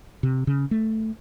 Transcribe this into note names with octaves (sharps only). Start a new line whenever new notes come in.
C3
C#3
A3